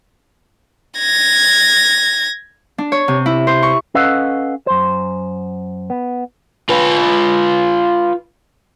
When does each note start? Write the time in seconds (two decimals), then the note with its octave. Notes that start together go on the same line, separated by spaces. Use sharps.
0.98 G#6 A#6
2.78 D4
2.92 C#5
3.08 C3
3.26 E4
3.47 C5
3.63 C#6
3.95 C#4 A4 B4 D#5 F5 F#5
4.67 F#2 C5
5.90 B3
6.69 F4 B4